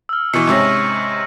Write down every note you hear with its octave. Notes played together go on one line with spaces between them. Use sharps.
E6 F6
B2 E3 C#6 C#7
G#2 C3 C#4 C#6 E6 A#6